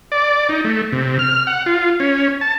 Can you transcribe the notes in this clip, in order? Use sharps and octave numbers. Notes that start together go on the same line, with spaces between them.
D5
D#4
A3
C3
F6
F#5
F4
C#4
A5